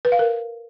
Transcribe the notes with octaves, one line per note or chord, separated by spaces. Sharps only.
B4
F5
A#4